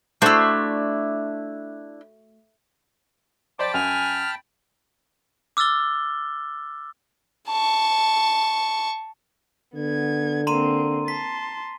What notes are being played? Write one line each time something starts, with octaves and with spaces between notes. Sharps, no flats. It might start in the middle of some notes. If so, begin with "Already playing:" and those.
A3 D4 E4 F#4 C5
C5 D5 G5 A5 B5 D6
F#2 G#5 F6
D6 E6 F6 A6 G7
A5 C#6
D3 B3 G#6
A#3 C4 A#5 C6 D#7
A5 C6 B6